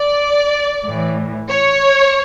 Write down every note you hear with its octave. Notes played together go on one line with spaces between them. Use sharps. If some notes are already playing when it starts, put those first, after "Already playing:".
Already playing: D5
A2 E3
C#5